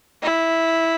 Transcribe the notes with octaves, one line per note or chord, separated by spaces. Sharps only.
E4